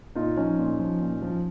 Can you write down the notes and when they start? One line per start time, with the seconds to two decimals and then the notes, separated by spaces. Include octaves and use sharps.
0.15 A#2 D#4 F4
0.37 F3 C#4 D#4
0.58 A#2
0.79 F3
1.01 A#2
1.22 F3